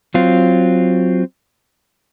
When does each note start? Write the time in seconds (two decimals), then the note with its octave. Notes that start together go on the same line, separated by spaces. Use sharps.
0.14 F#3 C4 F4